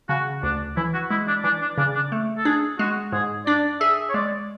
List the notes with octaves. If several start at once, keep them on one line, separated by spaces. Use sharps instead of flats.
C#3 F#4
D2 D4
E3 E4
F#4
G#3 E4
D4
E3 D4
D4
C#3 D4
D4
A3
A4
D4 G#4
G#3 F#4
G#2 G#4
D4 D5
G#4 E5
C#5
G#3 D5